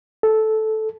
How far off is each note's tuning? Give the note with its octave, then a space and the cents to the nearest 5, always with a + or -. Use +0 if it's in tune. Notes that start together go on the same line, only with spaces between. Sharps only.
A4 -10